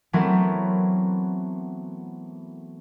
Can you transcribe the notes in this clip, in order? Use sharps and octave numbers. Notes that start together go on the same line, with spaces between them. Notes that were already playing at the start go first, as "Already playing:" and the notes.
E3 F#3 A3 B3 C4 A#4